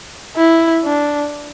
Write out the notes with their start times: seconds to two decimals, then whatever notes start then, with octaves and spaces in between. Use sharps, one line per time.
0.36 E4
0.84 D4